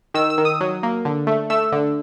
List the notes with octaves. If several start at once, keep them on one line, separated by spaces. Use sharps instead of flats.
D#3 E6
E6
D#3
D#6
F#3
A#3
D3
A3
A3 E6
D3